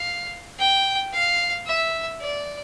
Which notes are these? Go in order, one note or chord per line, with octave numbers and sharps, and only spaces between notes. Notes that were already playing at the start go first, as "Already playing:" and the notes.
Already playing: F5
G5
F5
E5
D5